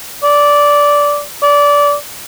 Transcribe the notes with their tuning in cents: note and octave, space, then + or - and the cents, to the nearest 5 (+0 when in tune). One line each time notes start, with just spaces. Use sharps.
D5 -15
D5 -20